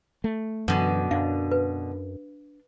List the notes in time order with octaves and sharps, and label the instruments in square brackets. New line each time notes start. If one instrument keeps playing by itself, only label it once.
[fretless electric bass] A3
[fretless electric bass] F#2 [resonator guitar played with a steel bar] B2 D3 [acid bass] E3
[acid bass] F#2 [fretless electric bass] D4 [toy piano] F5
[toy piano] B4